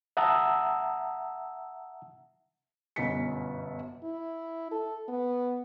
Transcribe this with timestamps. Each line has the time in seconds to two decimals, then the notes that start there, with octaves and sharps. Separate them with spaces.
0.17 E5 F#5 A5 A#5 D#6 E6
2.96 G1 F#2 B2 D#5 B6 C#7
4.04 E4
4.71 A4
5.09 B3